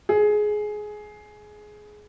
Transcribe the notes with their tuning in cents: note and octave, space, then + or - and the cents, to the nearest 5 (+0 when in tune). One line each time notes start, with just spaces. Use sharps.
G#4 +15